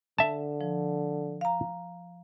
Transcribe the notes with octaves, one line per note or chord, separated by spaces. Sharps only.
D3 E5 A5
F3
F5 A#5